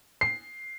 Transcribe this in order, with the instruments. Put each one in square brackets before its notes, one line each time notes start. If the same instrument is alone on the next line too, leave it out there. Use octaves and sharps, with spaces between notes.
[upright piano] C7